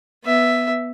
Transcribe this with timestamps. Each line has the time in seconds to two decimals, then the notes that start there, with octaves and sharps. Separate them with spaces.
0.24 B3 E5